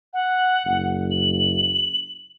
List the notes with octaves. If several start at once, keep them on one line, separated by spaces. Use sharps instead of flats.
F#5
F#1
F#7